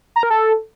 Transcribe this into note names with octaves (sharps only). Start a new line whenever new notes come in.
A#5
A#4
A4